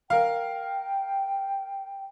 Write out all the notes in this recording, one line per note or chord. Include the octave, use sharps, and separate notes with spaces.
A#4 F5 G5